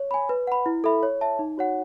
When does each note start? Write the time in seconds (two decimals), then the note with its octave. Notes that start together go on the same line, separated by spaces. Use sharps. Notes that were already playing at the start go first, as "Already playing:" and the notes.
Already playing: C#5
0.11 G#5 B5
0.29 B4
0.47 F#5 B5
0.66 E4
0.84 A4 E5 B5
1.03 C#5
1.21 E5 A5
1.39 D#4
1.58 F#4 C#5 F#5